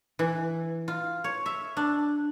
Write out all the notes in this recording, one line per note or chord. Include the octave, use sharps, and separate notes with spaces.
E3
F4
C#5
E5
D4